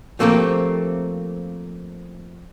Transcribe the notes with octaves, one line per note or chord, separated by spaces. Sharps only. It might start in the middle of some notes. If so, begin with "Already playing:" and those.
F3 A3 A#3 C4 G4